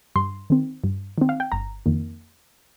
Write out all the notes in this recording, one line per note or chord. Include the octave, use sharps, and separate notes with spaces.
G2 C6
D#3 C4
G2
D#3 C4
F5
G5
G1 A#5
F2 D#3 A#3